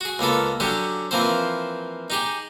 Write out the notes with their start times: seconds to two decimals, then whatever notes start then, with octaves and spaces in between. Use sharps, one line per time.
0.01 F#4 G#4
0.19 C#2 A#3 B3 A4
0.60 D3 F#3 C#4 G4
1.11 E3 F3 A#3 C4 C5
2.10 D#4 G4 G#4